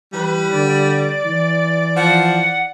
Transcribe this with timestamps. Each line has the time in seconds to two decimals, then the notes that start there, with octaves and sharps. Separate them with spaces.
0.13 E3 G3 B4
0.53 D3 D5
1.25 E3
1.96 F3 F#5